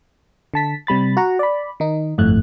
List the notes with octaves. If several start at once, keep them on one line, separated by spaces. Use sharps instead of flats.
D3 A5 B6
C3 G3 B5 A6
F#4 F#5 A#5
D5 B5
D#3 D#4
G1 F2 A2 A3 F#6